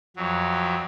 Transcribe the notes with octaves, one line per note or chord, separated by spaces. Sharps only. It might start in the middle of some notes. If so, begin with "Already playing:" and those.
F2 F#3